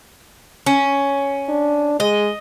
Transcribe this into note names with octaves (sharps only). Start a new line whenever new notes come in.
C#4
D4
G#3 D#5